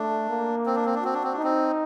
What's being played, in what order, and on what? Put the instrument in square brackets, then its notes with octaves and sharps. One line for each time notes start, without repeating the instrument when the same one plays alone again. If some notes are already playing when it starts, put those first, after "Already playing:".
Already playing: [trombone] A3 [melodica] D4
[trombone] A#3
[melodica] C4
D4
C4
D4
[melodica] C4 [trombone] F#4
[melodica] D4
C4
D4
[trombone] D#4
[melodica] C4